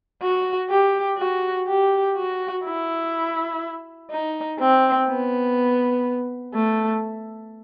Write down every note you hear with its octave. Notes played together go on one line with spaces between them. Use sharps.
F#4
G4
F#4
G4
F#4
E4
D#4
C4
B3
A3